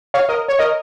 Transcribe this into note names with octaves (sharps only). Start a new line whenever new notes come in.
C#5 F5
A#4 D#5
C#5
A#4 D#5